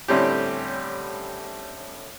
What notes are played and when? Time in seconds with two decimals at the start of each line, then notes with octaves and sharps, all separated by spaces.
0.08 A2 D3 G3 C4 C#4 G4